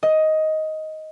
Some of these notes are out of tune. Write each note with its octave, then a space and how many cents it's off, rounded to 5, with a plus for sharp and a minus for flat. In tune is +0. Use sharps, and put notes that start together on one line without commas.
D#5 +10